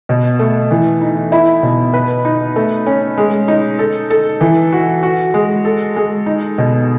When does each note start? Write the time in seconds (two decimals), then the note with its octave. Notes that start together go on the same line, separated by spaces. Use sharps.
0.09 B2
0.39 A3
0.71 E3
1.02 D#4
1.32 E4
1.63 B2
1.94 B4
2.25 D#4
2.56 A3
2.86 C#4
3.18 G#3
3.48 D#4
3.79 A4
4.10 A4
4.41 E3
4.73 F#4
5.03 F#4
5.34 G#3
5.65 A4
5.96 G#3
6.26 D#4
6.58 B2